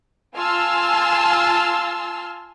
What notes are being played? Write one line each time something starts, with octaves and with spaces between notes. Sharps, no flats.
F4 G#5 A5 C6 E6 F6